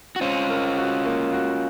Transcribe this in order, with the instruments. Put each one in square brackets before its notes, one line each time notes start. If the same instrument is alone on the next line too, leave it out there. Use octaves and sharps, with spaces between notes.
[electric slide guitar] F#4
[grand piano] C4 [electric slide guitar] C#4 F4
[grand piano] A#4
F#4
A#3
F#4